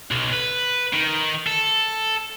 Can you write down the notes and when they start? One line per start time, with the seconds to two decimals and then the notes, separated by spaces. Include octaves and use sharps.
0.11 B1
0.32 B4
0.93 D#3
1.47 A4